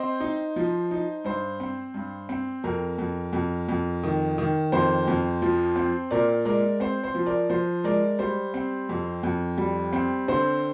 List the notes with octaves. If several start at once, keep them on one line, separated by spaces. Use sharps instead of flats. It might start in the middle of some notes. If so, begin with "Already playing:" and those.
Already playing: C4 C5 D#5
D#4
F3
D#4
G2 C5
C4
G2
C4
F2 A#4
F2
F2
F2
D#3
D#3
F2 C5
F2
F3
C4
A#2 A#4 D5
G#3 A#4 D5
C4 C5
C5
F3
A#4 D5
F3 C5
G#3 A#4 D5
G3 C5
C4
F2
F2
G3
C4
D3 C5